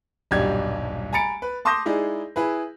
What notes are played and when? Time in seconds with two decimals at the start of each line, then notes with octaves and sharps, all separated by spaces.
0.31 D#1 B1 G2 D4 G4 G#6
1.13 G#5 A#5 B5 A6 C#7 D7
1.42 B4
1.65 A5 C6 D6 D#6 G6 A#6
1.86 G#3 D#4 E4 G#4 D5
2.36 E4 G#4 B4